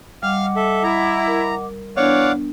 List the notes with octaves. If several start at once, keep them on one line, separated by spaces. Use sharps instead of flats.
G3 D#5 F5 F#5 D6 F6
A4 E5
E4 A#5
A#4
E3 B3 D4 C#5 D5 F5 F#5